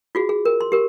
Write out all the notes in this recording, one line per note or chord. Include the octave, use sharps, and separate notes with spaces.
F4 F#4 G#4
G#4
A#4
C6
G4 A#4